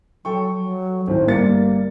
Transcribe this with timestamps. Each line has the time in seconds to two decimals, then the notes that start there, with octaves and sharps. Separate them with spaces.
0.25 F#3 A4 G5 C#6
0.60 F#3
1.07 G#1 A2 C5
1.27 G1 G3 A#3 A6 C#7